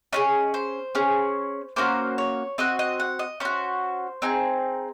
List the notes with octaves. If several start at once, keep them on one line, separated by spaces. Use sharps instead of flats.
C#4 F4 G#4 D#5
C5
C#4 G#4
A#3 C#4 F#4 C5
C#5
C4 F#4 D#5
D#5
F#5
D#5
C#4 F#4 C5
C4 D#4 G#4